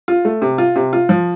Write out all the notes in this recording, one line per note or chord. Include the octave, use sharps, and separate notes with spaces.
F4
A3
C3
F4
C3
F4
F3